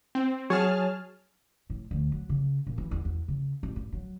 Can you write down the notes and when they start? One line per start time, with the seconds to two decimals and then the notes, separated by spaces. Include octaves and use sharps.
0.15 C4
0.50 F#3 G#4 C#5 A5 F6
1.70 A2
1.91 D2
2.12 F#3
2.29 C#3
2.67 A#2
2.78 E3
2.91 E2
3.05 E2
3.28 C#3
3.63 A1
3.76 G2
3.92 F#3